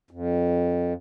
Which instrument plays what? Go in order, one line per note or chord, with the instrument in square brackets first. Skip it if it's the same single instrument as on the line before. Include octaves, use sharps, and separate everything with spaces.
[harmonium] F2